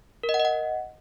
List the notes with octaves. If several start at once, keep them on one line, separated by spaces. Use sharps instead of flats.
A#4
D#5
F#5
D#5
F#5